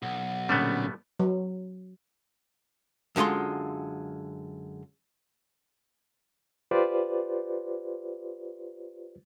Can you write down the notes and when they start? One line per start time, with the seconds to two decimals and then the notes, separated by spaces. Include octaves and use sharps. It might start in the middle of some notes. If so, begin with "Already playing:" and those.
0.02 B1 F#5
0.49 A#2 D3 G3 A3 B3 C#4
1.19 F#3
3.16 F#2 D3 G#3 F4 C6
6.71 F4 G4 B4 C5 D5